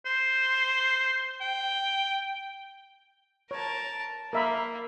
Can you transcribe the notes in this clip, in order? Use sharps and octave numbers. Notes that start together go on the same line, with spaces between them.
C5
G5
A#4 C#5 A5
A#3 A#4 E5 B5